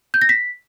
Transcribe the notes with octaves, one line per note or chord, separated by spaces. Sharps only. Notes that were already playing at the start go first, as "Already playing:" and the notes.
G6
A#6
B6